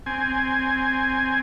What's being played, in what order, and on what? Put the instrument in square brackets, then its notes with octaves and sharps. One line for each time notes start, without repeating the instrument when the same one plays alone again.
[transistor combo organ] C4 G#5